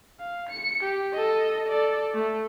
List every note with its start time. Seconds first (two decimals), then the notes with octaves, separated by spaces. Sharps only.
0.20 F5
0.49 C#7
0.83 G4
1.13 A4 D#5
1.69 A4 D5
2.14 A3